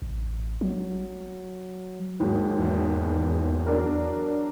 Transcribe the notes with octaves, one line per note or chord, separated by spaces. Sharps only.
A1
F#3
D#2 G#2 F#3
E2
F#3 D4 A#4